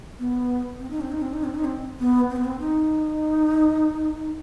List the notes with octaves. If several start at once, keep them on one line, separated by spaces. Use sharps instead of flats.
B3
C4
D#4
C4
D#4
C4
D#4
C4
D#4
C4
B3
C4
B3
C4
D#4